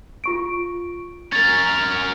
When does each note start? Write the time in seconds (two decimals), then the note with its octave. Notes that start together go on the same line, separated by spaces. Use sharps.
0.24 F4 C#6 D7
1.33 C#4 A#4 A6